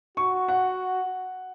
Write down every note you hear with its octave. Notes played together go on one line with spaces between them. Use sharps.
F#4 C#6
F#5